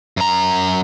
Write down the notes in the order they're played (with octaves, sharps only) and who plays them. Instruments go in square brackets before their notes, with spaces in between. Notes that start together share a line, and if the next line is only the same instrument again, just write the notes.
[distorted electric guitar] F#2 A#5